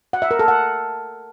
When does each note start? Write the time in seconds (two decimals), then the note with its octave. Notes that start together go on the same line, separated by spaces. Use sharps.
0.13 F#5
0.22 E5
0.31 A#4
0.39 A4
0.48 F#5